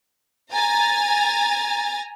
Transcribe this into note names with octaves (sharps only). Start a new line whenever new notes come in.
G#5 A#5 A6